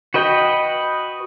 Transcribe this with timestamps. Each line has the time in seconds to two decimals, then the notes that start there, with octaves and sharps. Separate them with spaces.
0.14 F#4 B4 D#5 G5